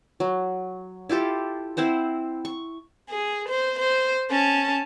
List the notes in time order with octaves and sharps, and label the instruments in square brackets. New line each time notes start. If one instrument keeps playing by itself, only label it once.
[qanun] F#3
E4 F4 G4 A4
C4 E4 C5 F#5
C#6
[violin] G#4
C5
C5
C#4 A5